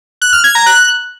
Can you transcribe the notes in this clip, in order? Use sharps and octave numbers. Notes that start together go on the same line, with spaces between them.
F#6
F6
G#6
A#5
F#6